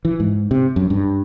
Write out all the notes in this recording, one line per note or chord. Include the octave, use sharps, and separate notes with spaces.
E3
G#2
C3
F#2
G2